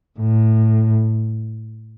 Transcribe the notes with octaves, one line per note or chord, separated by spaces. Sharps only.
A2